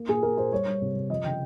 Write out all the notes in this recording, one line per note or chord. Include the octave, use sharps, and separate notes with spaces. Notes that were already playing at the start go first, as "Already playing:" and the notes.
Already playing: A#3
A#2 G#4
A#3 A#4
A#2 C5
G3 C#5
G3
C3
C3
F3 D#5
C#3 G5